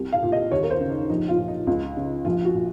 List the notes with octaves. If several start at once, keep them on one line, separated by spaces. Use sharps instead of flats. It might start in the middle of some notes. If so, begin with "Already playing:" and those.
Already playing: C2
F5
A#2
D#5
D#2 C#5
A#4
C5
C#3
D#4
A#1 D#4
F4
A#2
D#4
C#2
C#3
A#1 F4
F#4
A#2